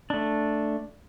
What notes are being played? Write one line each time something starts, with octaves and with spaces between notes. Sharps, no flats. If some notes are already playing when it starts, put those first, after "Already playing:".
A3 D4